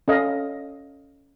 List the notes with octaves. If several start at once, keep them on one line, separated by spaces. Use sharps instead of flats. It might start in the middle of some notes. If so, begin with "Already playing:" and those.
C#4 A4 D#5 F5